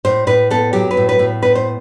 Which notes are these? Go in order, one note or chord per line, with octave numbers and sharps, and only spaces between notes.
A2 C5
A2 B4
B3 A4
F#3 G4
B4
A2
B4
A2
B3 B4
C5